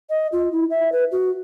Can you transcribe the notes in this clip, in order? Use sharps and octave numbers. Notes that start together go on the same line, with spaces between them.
D#5
F4
E4
E5
B4
F#4